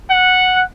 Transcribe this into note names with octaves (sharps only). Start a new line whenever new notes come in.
F#5